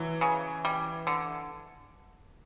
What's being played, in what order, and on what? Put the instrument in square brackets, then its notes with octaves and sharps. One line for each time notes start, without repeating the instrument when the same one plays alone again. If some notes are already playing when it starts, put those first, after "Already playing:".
Already playing: [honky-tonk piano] E3 [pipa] F#3
[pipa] C#3
G3
D3